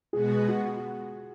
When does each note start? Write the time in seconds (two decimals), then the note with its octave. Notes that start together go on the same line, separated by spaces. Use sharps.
0.13 B2 G#3 B3 F#4 G#4
0.48 F#4